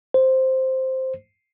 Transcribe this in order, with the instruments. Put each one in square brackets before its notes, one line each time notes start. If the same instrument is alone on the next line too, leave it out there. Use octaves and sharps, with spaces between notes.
[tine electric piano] C5